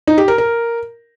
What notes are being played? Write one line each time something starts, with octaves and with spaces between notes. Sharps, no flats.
D#4
G4
A#4
A#4